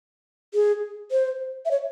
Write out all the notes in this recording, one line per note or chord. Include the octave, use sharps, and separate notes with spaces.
G#4
C5
E5
C#5